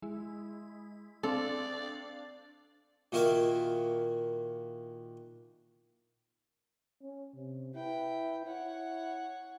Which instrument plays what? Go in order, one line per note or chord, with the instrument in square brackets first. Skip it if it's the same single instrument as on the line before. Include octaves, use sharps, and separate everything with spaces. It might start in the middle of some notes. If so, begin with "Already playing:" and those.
[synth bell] G#3 E4
[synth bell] C4 D4 F5 [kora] A4 [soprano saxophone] D5
[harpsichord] A#2 D#3 E4 F#4 A#4 F5
[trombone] C#4
C3
[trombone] E4 [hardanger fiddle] B4 G5
[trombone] E4 [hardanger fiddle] C#5 F#5